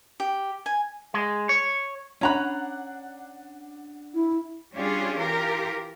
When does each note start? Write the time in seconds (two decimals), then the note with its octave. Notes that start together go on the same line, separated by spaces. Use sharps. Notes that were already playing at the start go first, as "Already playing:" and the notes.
0.20 G4
0.66 G#5
1.14 G#3
1.49 C#5
2.21 C#4 D4 F#5 A#5 B5 F#6
4.14 E4
4.74 G3 C#4 D4 F4 G4 G#4
5.19 E3 F4 G4 A#4